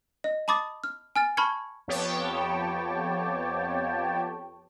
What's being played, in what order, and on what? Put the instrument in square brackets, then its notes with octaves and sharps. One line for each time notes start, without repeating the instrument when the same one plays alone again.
[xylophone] D#5
A5 B5 D6 D#6 A6
F6
G#5 F6 A6
A5 B5 C#6 F6 G#6 C#7
[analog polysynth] F2 B3 G4 C#5 G5 A5